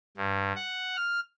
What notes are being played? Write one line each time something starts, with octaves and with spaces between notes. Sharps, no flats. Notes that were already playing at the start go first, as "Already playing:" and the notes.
G2
F#5
F6